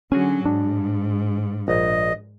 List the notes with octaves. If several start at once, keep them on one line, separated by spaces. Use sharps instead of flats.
D3 F#3 C#4 F#4 G#4 G#5
G#2 D4
A#1 D#5